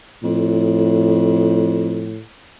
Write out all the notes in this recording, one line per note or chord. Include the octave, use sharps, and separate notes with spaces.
F2 A2